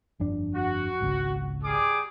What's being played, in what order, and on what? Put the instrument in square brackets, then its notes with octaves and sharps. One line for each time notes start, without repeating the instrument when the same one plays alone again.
[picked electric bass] G1 F2 D4
[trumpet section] F#4
[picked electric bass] G#1 C#2
[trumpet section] G3 G#4 D6